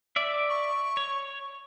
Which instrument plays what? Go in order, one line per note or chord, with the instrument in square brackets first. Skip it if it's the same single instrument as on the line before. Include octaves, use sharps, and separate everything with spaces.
[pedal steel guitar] D5 E5
[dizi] C#6
[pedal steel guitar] C#5